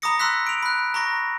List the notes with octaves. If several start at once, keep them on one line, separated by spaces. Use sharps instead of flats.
A#5 B5 D6 D#6 A#6 C#7
C6 E6 F#6 B6
D7 F7
B5 F#6
A#5 B5 C#6 A#6